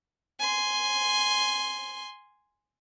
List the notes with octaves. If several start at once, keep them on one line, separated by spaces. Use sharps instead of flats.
G#5 C6